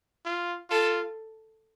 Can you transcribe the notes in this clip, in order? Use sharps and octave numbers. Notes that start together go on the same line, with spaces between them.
F4
F4 A4